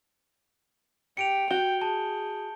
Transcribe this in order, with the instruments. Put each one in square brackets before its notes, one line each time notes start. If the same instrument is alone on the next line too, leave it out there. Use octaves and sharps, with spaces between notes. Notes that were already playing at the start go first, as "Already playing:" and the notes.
[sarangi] G4 [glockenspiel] C#7 D7 F7
[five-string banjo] F#4 [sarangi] G5 [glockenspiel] G6 G7
[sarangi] G#4 [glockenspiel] A5